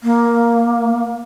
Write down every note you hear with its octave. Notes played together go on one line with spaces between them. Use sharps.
A#3